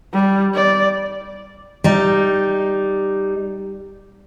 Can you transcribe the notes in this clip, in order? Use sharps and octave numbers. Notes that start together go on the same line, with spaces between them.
G3
D5
G3 D#4